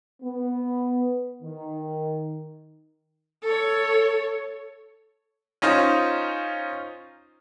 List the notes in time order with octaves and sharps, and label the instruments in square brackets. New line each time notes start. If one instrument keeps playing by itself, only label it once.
[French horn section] B3
D#3
[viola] A4 C#5
[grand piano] C#4 D#4 F4 C5